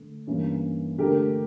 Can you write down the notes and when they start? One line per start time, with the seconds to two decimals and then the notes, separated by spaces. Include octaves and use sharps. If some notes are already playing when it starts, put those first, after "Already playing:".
Already playing: D3 A3
0.27 G2 E3 A#3 C#4
0.98 D3 A3 D4 G4 A#4